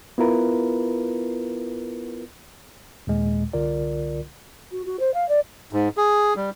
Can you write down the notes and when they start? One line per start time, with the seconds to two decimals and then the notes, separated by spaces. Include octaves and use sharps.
0.18 B3 E4 F4 A#4 B4
3.07 D#2 A#2 G#3
3.53 C2 D3 F4 A#4 D5
4.72 F#4
4.85 F#4
4.99 C5
5.13 F5
5.28 D5
5.73 G#2
5.97 G#4
6.36 G3